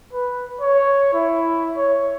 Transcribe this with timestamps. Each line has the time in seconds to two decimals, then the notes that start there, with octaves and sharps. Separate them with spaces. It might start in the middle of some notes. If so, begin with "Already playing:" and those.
0.13 B4
0.61 C#5
1.13 E4
1.77 C#5